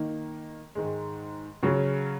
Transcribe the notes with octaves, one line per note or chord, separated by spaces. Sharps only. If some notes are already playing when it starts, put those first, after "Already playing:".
Already playing: D#3 A#3 D#4
G#2 D#3 G#3
C#3 F#3 C#4